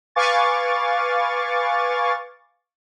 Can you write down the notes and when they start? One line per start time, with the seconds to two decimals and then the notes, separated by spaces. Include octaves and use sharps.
0.15 B4 F5 G#5 C#6 D6 A6